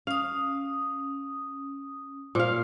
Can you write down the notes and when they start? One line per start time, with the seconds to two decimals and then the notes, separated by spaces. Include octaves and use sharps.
0.07 C#4 F5 D#6
2.35 A#2 C5 F5